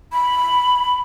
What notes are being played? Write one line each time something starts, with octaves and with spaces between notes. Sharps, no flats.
B5